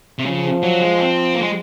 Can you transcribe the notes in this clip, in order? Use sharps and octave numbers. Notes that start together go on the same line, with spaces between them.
C3
C#3 F3
F#3
G#3
C4
A#3
G#3